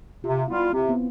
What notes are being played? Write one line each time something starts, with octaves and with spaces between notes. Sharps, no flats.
C3 F4
G3 B3 E4 F4
C3 C4
B3